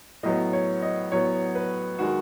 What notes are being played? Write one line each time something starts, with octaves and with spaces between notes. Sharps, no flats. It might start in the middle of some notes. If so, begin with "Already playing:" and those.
A2 F#3 B3 D#5
C#5
D#5
A2 F#3 B3 C#5
B4
D#3 G#3 F#4